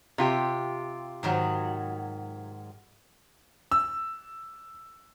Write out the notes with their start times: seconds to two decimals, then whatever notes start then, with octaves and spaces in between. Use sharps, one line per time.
0.18 C3 F4 G4
1.23 G#2 D#3 F#3
3.72 E6